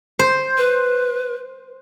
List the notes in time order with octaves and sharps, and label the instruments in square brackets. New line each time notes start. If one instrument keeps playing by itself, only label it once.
[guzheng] C5
[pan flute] B4